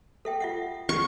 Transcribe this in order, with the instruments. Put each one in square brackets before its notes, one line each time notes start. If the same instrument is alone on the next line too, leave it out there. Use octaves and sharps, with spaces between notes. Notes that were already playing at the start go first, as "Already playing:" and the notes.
[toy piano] A4 E5 G5
F4 E5 F#5
[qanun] C#6